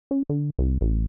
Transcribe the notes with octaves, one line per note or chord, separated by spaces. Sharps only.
C#4
D3
C2
A1